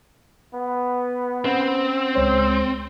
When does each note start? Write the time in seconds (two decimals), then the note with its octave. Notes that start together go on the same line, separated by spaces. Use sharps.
0.54 B3
1.45 C4 C#4 F#5
2.15 C#2 G#3 C5 C#5